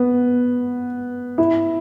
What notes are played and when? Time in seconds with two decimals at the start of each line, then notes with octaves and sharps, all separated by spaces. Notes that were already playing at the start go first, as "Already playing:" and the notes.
Already playing: B3
1.38 E4